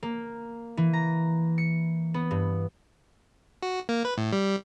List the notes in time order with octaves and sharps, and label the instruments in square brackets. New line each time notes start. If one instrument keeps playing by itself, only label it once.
[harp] A#3
E3
A#5
C#7
B3
G2
[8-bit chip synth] F#4
A#3
B4
A2
G3